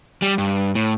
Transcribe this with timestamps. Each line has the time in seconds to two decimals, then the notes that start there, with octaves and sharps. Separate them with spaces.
0.22 G3
0.38 G2
0.75 A2